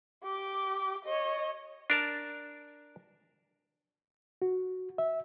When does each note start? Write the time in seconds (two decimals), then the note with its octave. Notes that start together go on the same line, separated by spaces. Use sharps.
0.24 G4 D6
1.05 C#5 D#5
1.90 D4 A#4 A5
4.42 F#4
4.98 E5